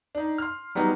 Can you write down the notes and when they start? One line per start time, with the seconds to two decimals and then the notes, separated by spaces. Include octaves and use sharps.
0.15 D4 D#4
0.38 C6 F6
0.75 F#3 G3 B3 D#4